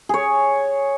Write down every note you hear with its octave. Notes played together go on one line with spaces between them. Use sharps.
G#4 C#5